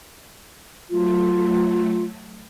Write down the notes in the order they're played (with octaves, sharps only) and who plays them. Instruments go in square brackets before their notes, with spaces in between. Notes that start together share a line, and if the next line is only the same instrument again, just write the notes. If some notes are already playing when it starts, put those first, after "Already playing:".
[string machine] F#3 A3 [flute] F4